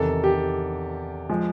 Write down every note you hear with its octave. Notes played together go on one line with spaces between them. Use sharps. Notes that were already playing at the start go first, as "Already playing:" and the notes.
Already playing: E2 C3 D#3 A4
G4
F3 G#3